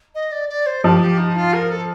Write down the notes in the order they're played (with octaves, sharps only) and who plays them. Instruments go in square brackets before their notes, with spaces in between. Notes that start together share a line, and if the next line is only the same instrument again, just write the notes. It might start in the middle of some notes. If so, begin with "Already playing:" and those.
[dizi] D#5
D5
D5
C5
[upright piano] F3 [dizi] G4
[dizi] G4
D#4
F4
A#4
A4